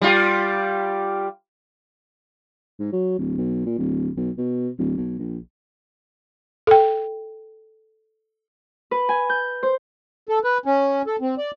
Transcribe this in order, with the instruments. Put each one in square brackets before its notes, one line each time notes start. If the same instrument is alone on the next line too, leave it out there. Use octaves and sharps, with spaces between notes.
[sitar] G3 F4 G4
[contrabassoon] G#2
F#3
D1
B1
A#2
D1
B1
B2
D1
B1
A#1
[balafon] A4 G5
[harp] B4
G#5
G6
C5
[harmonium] A4
B4
C#4
A4
C4
D5